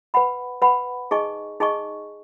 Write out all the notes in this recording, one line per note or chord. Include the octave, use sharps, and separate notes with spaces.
B4 F#5 B5
B4 F#5 B5
D#4 G#4 D#5 G#5 C#6
D#4 G#4 D#5 G#5 C#6